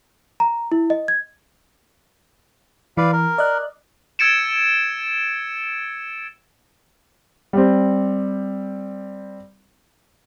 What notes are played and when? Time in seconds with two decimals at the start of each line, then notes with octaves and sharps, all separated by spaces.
0.40 A#5
0.72 E4
0.90 D#5
1.08 G#6
2.97 E3 B4 D5 F5
3.12 A#4
3.38 D5 D#5 F#6
4.19 E6 G#6 A6 C#7 D7 E7
7.53 G3 C4